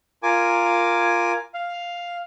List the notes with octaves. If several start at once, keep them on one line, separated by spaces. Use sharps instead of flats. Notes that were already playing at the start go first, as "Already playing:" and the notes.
F4 A#4 G#5 D6
F5